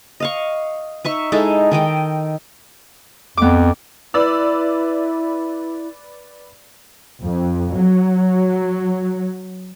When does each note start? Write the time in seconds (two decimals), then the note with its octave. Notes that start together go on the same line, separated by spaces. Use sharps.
0.20 D#5 F5 C#6
1.04 D#4 E5 C#6
1.32 G#3 D#4 E4 A4
1.71 D#3 D#5 G5
3.37 F2 B3 D6
4.14 E4 B4 D5 E6
7.23 F2
7.76 F#3